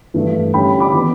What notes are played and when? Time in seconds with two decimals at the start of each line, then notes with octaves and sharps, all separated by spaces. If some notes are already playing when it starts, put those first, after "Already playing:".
0.14 G2 E3 A3
0.54 D3 G3 C#4 E4 G5 B5
0.80 B5 D6
0.94 E3 B3 E4